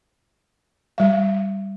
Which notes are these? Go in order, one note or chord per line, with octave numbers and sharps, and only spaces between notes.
G3 F5